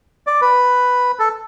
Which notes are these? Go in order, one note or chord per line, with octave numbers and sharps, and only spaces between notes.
D5
B4
A4